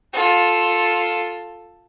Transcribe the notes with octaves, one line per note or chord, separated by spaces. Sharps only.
F4 A4